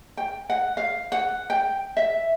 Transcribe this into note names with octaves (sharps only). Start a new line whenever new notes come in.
G5
F#5
F5
F#5
G5
E5